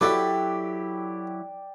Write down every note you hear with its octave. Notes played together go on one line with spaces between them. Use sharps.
F#3 E4 F#4 G4 A4 B4 D5 G5